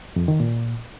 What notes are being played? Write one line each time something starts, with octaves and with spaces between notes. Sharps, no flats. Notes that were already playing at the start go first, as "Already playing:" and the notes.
F2
D#3
A#2